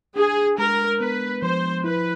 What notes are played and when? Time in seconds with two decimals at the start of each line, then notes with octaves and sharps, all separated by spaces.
0.16 D4 G#4
0.58 G#3 A#4
1.00 B3 B4
1.42 F3 C5
1.84 E4 B4